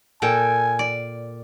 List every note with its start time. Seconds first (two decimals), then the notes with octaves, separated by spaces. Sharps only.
0.22 A#2 A4 G5 G#5
0.79 D5